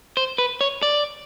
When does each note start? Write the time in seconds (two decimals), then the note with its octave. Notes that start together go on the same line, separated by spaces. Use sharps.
0.17 C5
0.38 B4
0.61 C#5
0.83 D5